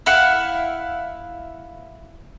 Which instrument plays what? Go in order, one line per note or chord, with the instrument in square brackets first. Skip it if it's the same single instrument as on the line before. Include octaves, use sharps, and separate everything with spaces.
[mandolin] E4 F5 F#5